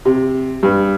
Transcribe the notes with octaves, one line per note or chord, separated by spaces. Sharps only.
C3
G2